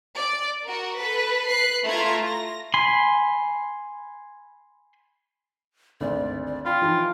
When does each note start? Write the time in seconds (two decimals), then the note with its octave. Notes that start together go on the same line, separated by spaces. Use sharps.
0.16 D5
0.62 F#4 A#4
0.96 A4 B4
1.47 B4 F#6 C7
1.85 A3 E4 F4 A#5 G#6
2.25 A#6
2.74 G#5 B5 C6
6.01 G#1 D2 D5
6.47 D5
6.66 F4 G5 B5
6.82 E3 F3 D#4